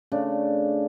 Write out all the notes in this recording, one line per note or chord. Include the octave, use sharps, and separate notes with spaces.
C#3 A3 D4